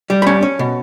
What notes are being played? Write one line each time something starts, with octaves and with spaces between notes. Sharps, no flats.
G3
B5
C#4 A5
C#4
B2